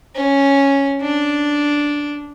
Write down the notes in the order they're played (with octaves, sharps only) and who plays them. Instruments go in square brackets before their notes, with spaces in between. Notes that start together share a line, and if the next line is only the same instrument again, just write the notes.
[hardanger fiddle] C#4
D4